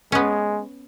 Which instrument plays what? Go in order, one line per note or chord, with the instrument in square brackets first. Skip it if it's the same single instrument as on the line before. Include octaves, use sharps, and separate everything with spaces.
[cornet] G#3 [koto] B3 C#4